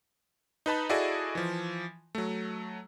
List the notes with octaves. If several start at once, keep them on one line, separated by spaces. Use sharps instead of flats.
D#4 B4 A5 B5
E4 F#4 G#4 A4 D5 D#5
E3 F3
F#3 A3